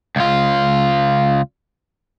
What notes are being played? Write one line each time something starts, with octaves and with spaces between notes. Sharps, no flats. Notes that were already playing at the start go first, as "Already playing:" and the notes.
C#2 F4